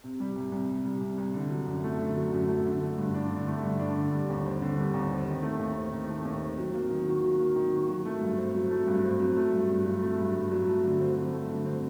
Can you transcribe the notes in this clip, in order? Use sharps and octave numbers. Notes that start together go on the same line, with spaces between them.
C3
G3
C2
C2
C3
G3
C2
C2
D3
F#3
F#2
A3
D3
F#3
F#2
A3
D3
A3
G2
D4
D3
A3
G2
D4
D3
G3
D#2
C4
D3
G3
D#2
C4
D#3
A3
D#2
C4
D#3
A3
D#2
C4
F#3
A#3
D#3
F#4
F#3
A#3
D#3
F#4
F#3
A3
G2
C4
F#3
A3
G2
C4
F#3
A3
G2
G2
F#3
A3
G2
G2
F#3
A3
D3
C4
F#3
A3
D3
C4